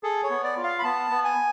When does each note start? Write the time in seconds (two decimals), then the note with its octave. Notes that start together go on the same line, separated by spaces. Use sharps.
0.03 G#4 A4
0.23 C#5
0.30 B3
0.43 D5
0.57 F4
0.64 F5
0.79 B5
0.83 B3 A5
1.10 B3
1.24 G#5